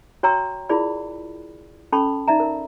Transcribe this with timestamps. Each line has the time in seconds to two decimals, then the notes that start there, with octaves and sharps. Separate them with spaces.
0.23 F#4 C#5 G5 A#5 C#6 E6
0.69 E4 F4 G#4 A#4 D5 B5
1.92 C#4 A4 A5 B5 C#6
2.28 D#4 D5 E5 A#5
2.40 A#4